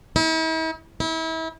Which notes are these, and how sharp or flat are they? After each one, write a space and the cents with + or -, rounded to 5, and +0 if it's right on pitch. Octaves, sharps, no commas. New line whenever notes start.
E4 -45
E4 -35